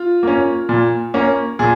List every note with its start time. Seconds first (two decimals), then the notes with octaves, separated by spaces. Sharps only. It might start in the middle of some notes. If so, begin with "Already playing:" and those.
Already playing: F4
0.23 A#3 C#4
0.69 A#2
1.14 A#3 C#4
1.59 A#2 G#4